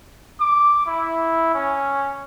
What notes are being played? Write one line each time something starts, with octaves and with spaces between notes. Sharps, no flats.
D6
E4
C#4